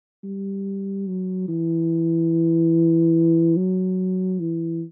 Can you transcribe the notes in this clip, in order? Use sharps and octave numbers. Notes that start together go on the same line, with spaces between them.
G3
F#3
E3
F#3
E3